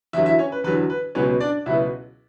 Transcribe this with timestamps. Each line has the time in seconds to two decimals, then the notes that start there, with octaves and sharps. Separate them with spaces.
0.13 E2 D3 F#3 E4 E5
0.26 E4 E5
0.39 C#4 C#5
0.52 B4
0.64 E2 D3 F#3 B4
0.90 B4
1.15 C#2 B2 F#3 B3 C#4 C#5
1.40 D4 D5
1.66 C#2 B2 F#3 B3 E4 E5